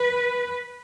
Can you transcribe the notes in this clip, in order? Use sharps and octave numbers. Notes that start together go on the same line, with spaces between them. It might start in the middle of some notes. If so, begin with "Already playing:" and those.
Already playing: B4